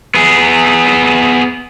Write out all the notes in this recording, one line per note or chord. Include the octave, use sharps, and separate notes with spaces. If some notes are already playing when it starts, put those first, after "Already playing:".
B3 G#4